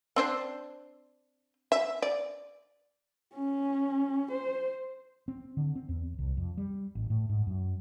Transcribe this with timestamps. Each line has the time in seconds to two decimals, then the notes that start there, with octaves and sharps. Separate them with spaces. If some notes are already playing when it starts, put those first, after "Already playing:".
0.16 C4 D4 C5
1.72 E5
2.02 D5
3.35 C#4
4.31 C5
5.28 C4
5.57 D3
5.76 C4
5.89 E2
6.19 C2
6.37 F2
6.57 G3
6.95 A1
7.10 A2
7.29 G#2
7.47 F#2